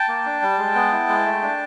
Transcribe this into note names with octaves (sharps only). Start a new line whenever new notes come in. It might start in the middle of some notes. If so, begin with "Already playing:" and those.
Already playing: G5 A5
A#3
D4
G3
G#3
B3
E4
G#3
A3
D4